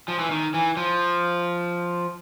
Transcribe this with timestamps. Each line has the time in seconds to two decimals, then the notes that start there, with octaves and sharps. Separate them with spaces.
0.08 F3
0.19 E3
0.31 D#3
0.54 E3
0.77 F3